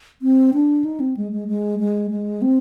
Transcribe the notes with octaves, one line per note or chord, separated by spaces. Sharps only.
C4
D4
D#4
C4
G#3
G#3
G#3
G#3
G#3
C4